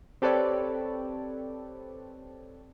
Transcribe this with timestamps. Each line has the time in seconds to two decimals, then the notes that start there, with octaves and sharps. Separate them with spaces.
0.22 C4 G4 A4 B4 C#5 D5